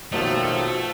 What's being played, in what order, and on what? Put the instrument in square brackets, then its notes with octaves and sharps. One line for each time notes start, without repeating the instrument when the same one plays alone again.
[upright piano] A#1 B2 F7 [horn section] D#3 F3 F#3 [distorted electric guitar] A3